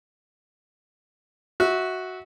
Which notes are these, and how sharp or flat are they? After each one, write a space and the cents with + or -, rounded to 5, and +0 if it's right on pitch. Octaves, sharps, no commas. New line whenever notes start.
F#4 +0 E5 -20